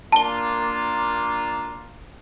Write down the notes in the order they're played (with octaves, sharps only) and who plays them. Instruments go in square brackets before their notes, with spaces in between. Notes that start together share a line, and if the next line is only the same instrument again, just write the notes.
[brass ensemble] A#3 D4 F4 [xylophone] A5 G7